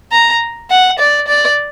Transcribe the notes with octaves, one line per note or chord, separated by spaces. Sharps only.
A#5
F#5
D5
D5